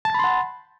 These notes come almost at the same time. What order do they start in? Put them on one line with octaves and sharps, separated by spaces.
A5 A6 B5 C6 F#5